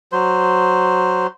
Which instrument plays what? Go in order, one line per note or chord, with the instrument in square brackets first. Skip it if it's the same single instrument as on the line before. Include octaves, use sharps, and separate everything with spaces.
[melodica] F#3 C5